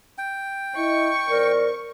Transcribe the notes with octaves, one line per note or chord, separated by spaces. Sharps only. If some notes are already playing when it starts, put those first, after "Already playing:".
G5
E4 D#5 C#6
F2 A#4 C5 D5